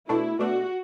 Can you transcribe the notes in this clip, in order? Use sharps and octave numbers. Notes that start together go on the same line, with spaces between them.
B2 A3 D4 E4
B2 A3 D4 F#4